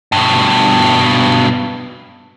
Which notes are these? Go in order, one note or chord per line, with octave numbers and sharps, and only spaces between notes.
G2 B2